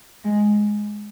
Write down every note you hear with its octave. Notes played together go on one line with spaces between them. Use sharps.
G#3